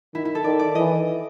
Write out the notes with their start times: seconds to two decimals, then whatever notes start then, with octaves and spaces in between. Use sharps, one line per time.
0.15 D#3 E4
0.25 E4
0.35 A4
0.44 D#3 D5
0.59 D5
0.75 E3 D#5